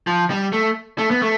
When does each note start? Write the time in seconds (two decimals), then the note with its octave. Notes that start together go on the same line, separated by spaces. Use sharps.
0.07 F3
0.30 G3
0.53 A3
0.98 A3
1.11 B3
1.22 A3